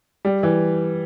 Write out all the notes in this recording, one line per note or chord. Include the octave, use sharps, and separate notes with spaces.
G3
E3